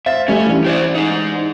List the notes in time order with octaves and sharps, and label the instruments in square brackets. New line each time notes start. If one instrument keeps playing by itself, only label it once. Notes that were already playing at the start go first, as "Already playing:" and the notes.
[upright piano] C5 F5 A6 [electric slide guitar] E5
[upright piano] G3 A3 [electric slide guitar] C#4
[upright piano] E3 D4
[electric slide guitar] G4 C5 D5
D#4 G#4